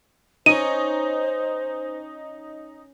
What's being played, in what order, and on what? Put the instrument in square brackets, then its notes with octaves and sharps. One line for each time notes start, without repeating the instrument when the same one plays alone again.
[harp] C#4 C#5 [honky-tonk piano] D#4 [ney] C5 [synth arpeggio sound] D#7